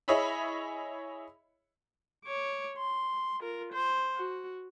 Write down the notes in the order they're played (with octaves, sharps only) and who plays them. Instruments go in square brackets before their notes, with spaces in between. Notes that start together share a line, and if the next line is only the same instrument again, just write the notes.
[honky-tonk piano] E4 G#4 C#5 D#5 E5 B5
[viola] C#5 D6
C6
F4 A#4
C5
F#4